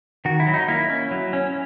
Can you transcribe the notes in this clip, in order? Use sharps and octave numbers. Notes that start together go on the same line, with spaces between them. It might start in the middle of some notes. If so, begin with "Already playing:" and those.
D#3 F#4
E4
F#3
D#4
A#3 E4
C#4
F#3
C#4